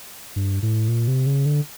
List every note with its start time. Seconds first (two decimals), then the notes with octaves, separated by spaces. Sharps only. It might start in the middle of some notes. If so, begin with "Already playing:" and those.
0.36 G2
0.62 A2
0.88 A#2
1.08 C3
1.26 C#3
1.46 D3